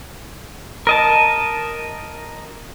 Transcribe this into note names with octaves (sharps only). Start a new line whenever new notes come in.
A#4 D#5 A5